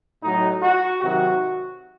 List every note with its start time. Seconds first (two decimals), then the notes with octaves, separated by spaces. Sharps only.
0.22 A2 F#3 D#4
0.62 F#4
1.01 C3 D#3 F#3 F#4